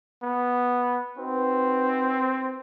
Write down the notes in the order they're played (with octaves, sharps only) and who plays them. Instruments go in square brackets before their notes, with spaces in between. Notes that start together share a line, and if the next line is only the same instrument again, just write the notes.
[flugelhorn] B3
[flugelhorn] C4 [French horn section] D#4 F#4 B4